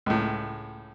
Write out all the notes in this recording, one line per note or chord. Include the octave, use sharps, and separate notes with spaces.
C#2 A2